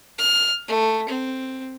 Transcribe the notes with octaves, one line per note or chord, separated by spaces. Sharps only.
F6
A3
C4